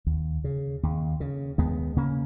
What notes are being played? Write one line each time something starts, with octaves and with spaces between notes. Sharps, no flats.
D#2
C#3
D#2
C#3
D#2 G#3 B3
C#3 A#3 C#4